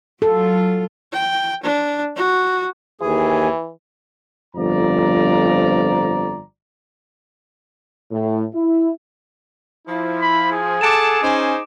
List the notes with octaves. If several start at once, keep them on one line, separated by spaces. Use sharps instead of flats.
F#3 F4 A4
G5
D4
F#4
D#2 E3 G#4
G1 F2 F3 D5 A#5
A2
E4
F3 E4
B5
G#4
A4 F#5 A5 D6 D7 E7
C#4 D#4 C5